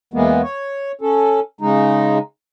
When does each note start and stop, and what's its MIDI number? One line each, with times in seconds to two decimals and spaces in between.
0.14 0.42 40
0.14 0.42 52
0.14 0.42 56
0.14 0.42 58
0.14 0.42 59
0.43 0.92 73
1.01 1.40 61
1.01 1.40 69
1.61 2.18 49
1.61 2.18 56
1.61 2.18 63